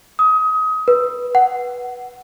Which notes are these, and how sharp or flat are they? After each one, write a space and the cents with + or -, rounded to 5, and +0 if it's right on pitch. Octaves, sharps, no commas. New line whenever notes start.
D#6 +25
B4 -10
F#5 +15